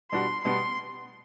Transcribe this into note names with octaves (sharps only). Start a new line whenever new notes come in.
B2 G3 D4 F#4 C6
B2 G3 B3 C6